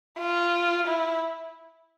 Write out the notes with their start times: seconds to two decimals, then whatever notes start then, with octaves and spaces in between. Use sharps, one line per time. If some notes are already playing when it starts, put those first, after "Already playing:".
0.20 F4
0.87 E4